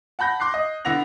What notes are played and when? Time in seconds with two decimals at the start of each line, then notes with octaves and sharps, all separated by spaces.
0.19 F#5 A5 B5 G6 A#6
0.40 C6 D6 F#6 C7
0.54 D#5
0.85 D3 B3 E4 F#5 A#6 F7